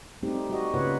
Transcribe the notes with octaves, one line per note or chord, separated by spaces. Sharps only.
G3 A3 C4 D#4 G4
G3 F#4 D#5
C#3 A#3 F4 B4 C#5 F#5